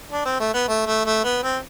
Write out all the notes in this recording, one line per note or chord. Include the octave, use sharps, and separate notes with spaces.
D4
C4
A3
B3
A3
A3
A3
B3
C4